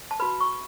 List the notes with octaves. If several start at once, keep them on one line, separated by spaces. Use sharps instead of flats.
A5
F#4 B4 B5
C#6